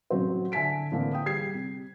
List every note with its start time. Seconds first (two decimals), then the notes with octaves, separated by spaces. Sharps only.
0.10 A1 C3 F#3 C5
0.52 D3 E5 G#5 A5 B6 D7
0.91 A2 D3 E3 A#3 C4 D4
1.13 G5 D#6
1.26 G3 G#4 G#6 C7
1.55 C3